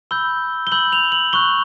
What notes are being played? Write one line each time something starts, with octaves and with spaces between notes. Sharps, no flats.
B5 E6 G6 G7
G7
B5 E6 G6 F#7
F7
F#7
C#6 F#6 G7